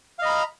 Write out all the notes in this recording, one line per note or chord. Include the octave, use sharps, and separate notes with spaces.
D#5 F5 A#5 B5